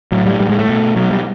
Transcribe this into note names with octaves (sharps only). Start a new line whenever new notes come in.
A2 F#3
G3
A2 G3
G#3
A3
B2
B2 F#3
G3